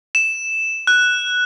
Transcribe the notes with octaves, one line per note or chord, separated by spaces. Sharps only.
E7
F#6